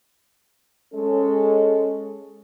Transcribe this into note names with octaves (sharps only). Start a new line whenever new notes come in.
G#3 C#4 A4